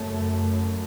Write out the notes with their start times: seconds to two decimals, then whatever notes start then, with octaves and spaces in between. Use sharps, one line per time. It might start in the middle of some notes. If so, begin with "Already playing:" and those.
Already playing: F#2 C#3 A3